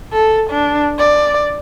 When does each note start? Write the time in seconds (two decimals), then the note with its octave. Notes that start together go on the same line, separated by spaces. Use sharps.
0.13 A4
0.50 D4
0.99 D5